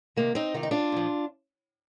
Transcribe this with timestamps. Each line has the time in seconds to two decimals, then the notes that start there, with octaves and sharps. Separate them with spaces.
0.16 C3 D#3 A#3
0.35 C4 D#4
0.54 C3 D#3 F4
0.63 D#4
0.71 D4 F4
0.92 A#2 F3